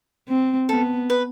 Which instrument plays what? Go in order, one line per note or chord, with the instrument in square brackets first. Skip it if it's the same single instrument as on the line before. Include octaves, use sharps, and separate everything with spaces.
[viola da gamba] C4
[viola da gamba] B3 [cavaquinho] A4
[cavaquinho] B4